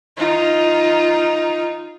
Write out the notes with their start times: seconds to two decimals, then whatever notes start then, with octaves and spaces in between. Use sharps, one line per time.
0.17 D#4 F4